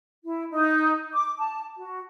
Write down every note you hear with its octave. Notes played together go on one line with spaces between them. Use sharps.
E4
D#4
D6
A5
F#4